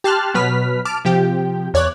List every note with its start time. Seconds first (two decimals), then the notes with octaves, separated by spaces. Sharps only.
0.04 G4 A5 C6 F6 F#6
0.34 B2 F#3 B4 F6 B6
0.85 A5 D6 F6
1.05 C3 F3 G4 G5
1.74 E2 C#5 D5 F#6